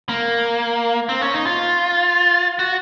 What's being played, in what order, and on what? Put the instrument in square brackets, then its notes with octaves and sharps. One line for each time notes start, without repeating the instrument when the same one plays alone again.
[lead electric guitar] A#3
C4
C#4
D#4
F4
F#4